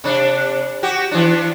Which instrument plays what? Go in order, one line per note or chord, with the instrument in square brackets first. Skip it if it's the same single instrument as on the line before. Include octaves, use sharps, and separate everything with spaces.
[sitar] C3 D4
F#4 G4
E3 D4